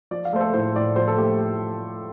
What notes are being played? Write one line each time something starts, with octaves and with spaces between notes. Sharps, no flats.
F3 D5
F5
A3 C5
A4
A2 C5
A2 D5
F3 C5
A4
A3 G4